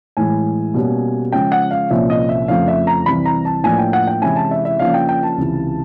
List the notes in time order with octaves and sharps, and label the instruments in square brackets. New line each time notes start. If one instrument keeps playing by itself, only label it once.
[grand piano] A2 E3 G#3 G#5
B2 G3 A#3 C#4
C#3 F3 G#3 G5
F#5
F5
C2 A#2 F3 A#3 C#4 E5
D#5
E5
F2 C#3 F3 A3 F5
E5
A#5
C2 C3 E3 G3 B5
A#5
A5
A2 F3 A#3 D4 G#5
G5
F#5
G5
C3 E3 G#3 C#4 E4 G#5
A5
E5
E5
C#3 F3 A#3 D4 F5
G5
G5
A5
C#2 C3 E3